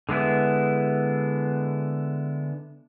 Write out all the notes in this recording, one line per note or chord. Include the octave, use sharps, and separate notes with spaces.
D3 G#3 B3 E4